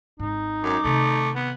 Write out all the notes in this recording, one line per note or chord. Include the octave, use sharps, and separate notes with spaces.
G#1 G#2 D#4
F#2 D6
C3 D#3 A3
B3